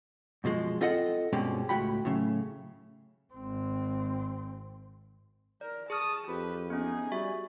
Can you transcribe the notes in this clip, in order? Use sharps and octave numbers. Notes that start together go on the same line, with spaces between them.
F#2 B2 F3 G#3
C4 F4 A4 D#5 F#5
G2 B2 G#3 C4 C#4 G4
C#2 A2 F#3 F#4 G5 B5
A2 C#3 E3 F#3
G#1 C4
A#4 D5
G#4 A5 C#6 D#6 F6
F2 G4 B4
B3 C#4 D#4 G#4
G3 F#4 E5 C#6